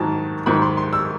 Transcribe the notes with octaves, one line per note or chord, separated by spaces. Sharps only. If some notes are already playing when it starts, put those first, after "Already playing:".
Already playing: G#2 D#3 F#3 A5
G#2 D#3 F#3 B5
C6
C6
E6